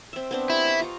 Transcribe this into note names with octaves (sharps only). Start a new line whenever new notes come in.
C4 E5
B3 C4 D4
E4 G4
D#5 C#6
F4 A#5 C#6